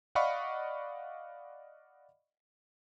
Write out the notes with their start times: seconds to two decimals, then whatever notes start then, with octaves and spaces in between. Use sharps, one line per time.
0.15 D5 D#5 F5 F#5 B5 C#6